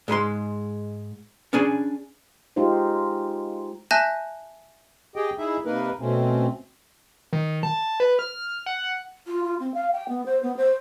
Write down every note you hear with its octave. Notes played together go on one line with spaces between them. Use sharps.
G#2 G#3 B5 C6
C#4 D4 G#4 D5 G#5
G#3 D#4 F4 G4 C5
E5 G#5 A5 F#6 G6 A#6
G4 G#4 D#5 G5
D#4 E4 G#4 E5
C3 A#3 D#4 A#4 B4
B2 A3 C4 C#4
D#3
A5
B4
F6
F#5
F4
F4
C4
F5
G5
B3
C5
B3
C5